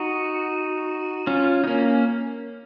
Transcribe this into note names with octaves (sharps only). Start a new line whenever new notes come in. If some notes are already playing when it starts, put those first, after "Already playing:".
Already playing: D#4 F#4
C#4 F4
D#4
A#3 C#4